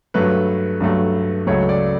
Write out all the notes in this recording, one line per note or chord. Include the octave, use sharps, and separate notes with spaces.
G2 F#3 A3 B4
G2 F#3 A3
C#2 C#3 F#3 A3 C#5
D5